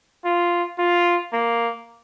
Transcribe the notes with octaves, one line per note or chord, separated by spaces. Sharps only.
F4
F4
A#3